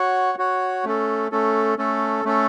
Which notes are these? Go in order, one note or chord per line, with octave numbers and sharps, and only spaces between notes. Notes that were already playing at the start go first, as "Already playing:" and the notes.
Already playing: F#4 C#5 F#5
F#4 C#5 F#5
A3 C#4 A4
A3 C#4 A4
A3 C#4 A4
A3 C#4 A4